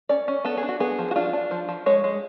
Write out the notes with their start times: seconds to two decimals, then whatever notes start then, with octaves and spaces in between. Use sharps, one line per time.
0.09 C#4 D5
0.28 C#4
0.45 B3 A4
0.57 G#4
0.63 D4
0.69 F#4
0.80 B3 G#4
0.98 F3
1.11 F#4
1.16 D4 F4
1.33 D4
1.51 F3
1.69 F3
1.86 G#3 C#5
2.04 G#3